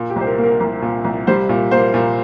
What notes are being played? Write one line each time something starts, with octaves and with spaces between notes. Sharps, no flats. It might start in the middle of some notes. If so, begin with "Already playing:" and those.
Already playing: A#2
G4
C2 C5
A#4
A#3
A#4
C2
A#2
C2
G3 C5
A#2
A#3 C5
A#2